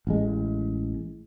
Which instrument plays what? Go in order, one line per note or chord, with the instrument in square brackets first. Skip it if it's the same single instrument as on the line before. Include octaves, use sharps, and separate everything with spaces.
[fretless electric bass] A1 G#3